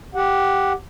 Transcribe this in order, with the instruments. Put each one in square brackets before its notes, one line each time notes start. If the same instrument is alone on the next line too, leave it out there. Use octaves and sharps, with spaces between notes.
[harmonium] G4 F#5